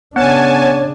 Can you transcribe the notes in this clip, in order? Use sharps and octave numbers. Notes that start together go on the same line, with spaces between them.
C#3 B3 D4 C#5 F#5 G#5 A5 F#6